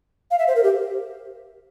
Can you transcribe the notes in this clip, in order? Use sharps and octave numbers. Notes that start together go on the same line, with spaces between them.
F5
E5
C5
A#4
G4